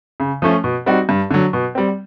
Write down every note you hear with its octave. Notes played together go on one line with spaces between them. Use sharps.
C#3
F3 A3 C#4
B2
G3 C4 D#4 F#4
G2
D3 F#3
B2
G3 C4